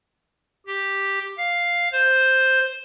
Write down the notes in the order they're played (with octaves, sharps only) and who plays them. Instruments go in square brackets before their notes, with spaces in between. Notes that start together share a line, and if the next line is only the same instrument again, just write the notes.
[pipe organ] G4
F5
C5